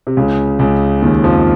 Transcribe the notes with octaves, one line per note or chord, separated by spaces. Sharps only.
C3
C#2 C#3
C#2 C#3
D#2 D#3
F2 F3